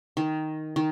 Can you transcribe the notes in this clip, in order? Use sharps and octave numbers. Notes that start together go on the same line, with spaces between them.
D#3
D#3